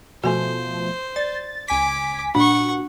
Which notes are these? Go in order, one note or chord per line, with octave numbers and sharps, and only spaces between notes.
B2 F3 A3 F#4 C5 G#5
D5 A6
C#2 G#5 D6 B6
A#2 D4 F#4 F#5 C#6